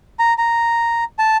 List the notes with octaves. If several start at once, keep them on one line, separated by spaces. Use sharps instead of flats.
A#5
A#5
A5